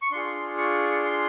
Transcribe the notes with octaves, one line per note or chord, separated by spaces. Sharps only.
C#6
D4 F4 G#4 C6
C#6
C6